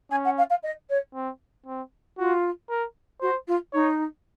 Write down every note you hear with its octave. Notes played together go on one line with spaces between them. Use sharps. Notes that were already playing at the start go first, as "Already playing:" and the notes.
C#4 G#5
F#5
F5
F5
D#5
C#5
C4
C4
F4 F#4
A#4
F#4 C5
F4
D#4 C#5